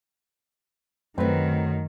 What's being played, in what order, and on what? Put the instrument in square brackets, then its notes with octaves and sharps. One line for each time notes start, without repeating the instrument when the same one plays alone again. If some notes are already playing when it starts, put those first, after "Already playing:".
[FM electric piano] F#2 [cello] D#3 [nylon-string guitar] F#3 A3 [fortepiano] C4 B4